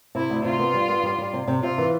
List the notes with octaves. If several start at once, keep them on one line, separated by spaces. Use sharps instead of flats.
C3 E4
D2
C3 F4
B3
G3
B3
G3
G3
C3
C3
C3 F4
E3